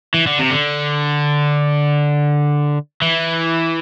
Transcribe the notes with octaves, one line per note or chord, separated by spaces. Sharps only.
E3
D3
C3
D3
E3